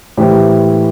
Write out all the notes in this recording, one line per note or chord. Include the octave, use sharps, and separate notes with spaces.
A2 E3 G3 G4 C5